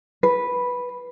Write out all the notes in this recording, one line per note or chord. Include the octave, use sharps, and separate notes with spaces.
B4